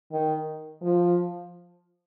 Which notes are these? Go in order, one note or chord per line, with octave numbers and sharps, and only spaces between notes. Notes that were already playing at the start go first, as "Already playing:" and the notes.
D#3
F3